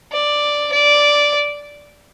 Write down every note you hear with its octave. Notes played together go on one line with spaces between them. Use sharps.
D5
D5